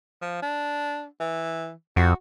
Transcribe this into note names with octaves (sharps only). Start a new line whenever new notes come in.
F3
D4
E3
F2 F#4